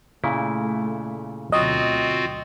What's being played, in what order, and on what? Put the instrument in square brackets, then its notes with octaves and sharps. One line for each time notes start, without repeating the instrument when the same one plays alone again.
[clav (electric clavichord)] A#2 C#3 E4 [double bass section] A3
[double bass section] D2 B2 [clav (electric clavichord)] F#3 [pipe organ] C4 F4 F#4 [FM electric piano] D#5